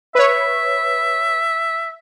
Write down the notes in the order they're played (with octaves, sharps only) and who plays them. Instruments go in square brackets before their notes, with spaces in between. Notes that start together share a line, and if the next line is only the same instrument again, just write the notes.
[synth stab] B4 C#5 [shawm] E5